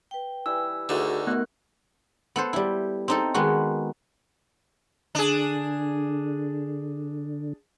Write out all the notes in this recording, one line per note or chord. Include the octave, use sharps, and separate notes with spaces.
B4 G5
E3 G3 E6
D2 D3 D#3 F#4 G#4
A3 B3 A#4 F#6
B3 A4 C5
G3 E4
C4 D#4 A4
D#3 G#3 B3 D#4 F#4
D3 D4 G#4